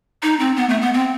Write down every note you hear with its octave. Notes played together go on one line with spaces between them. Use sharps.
D#4
C4
B3
A3
B3
C4